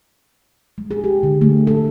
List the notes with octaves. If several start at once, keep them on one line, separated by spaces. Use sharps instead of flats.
G#3
G#4
G4
D3
A3
A4